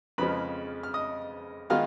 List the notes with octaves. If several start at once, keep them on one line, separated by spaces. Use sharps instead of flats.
F2 C#3 F3 G#3 B4 B5
F6
D#5 D#6
D#3 G#3 B3 F4 F5 F6